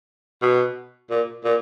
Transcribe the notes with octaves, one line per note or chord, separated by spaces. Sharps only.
B2
A#2
A#2